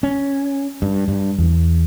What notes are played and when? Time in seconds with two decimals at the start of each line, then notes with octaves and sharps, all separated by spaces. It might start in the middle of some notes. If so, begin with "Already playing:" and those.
0.03 C#4
0.82 G2
1.08 G2
1.38 E2